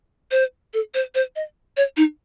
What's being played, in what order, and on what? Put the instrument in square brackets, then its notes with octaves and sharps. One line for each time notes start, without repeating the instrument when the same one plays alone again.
[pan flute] C5
A4
C5
C5
D#5
C#5
D#4